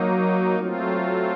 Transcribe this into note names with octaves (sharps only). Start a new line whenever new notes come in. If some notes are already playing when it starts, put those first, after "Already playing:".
Already playing: F#3 A#3 D#4
F#3 A3 C4 F4